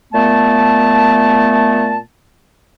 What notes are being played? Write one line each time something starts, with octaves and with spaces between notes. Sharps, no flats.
A#2 A3 B3 A5